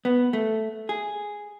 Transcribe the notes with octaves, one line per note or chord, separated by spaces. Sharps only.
B3
A3
G#4